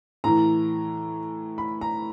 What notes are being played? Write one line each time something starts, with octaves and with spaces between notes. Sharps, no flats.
A2 E3 A#5
B5
A#5